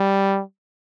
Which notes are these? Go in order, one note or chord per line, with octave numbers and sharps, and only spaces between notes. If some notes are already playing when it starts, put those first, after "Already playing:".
Already playing: G3